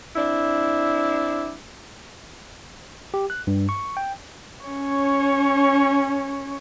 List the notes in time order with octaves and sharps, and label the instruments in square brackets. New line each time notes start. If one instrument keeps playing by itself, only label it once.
[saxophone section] C4 D4 E4
[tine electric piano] G4
F#6
G2
C#6
G5
[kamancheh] C#4 C#5